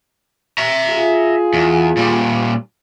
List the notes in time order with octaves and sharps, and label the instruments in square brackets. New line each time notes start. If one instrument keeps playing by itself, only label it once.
[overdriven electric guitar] E5 A#5
[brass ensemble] F4 G#4
[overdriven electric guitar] E2
A#2 G3